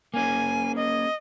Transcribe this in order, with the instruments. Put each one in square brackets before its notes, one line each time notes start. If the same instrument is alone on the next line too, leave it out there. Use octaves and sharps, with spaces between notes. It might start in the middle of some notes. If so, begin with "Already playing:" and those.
[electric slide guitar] A#3 C#4 G#4 [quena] G#5
[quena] D#5